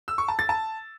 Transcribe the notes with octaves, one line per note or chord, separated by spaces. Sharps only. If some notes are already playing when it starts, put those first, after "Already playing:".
E6
C#6
A5
A6
A5